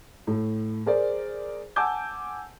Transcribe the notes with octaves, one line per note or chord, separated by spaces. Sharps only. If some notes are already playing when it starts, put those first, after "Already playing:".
A2
G#4 A#4 C5 D5
F#5 G#5 A5 D6 E6 G6